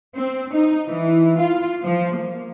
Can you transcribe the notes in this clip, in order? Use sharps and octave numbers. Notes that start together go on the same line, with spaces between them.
C4
D#4
E3
F4
F3
A#3